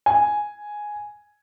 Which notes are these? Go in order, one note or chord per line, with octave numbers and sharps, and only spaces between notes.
G#5